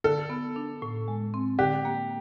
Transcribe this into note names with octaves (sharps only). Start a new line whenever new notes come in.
D3 A4
B3
D4
A2
G#3
C4
D3 G4
A#3